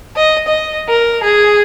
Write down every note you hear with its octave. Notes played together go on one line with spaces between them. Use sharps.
D#5
D#5
A#4
G#4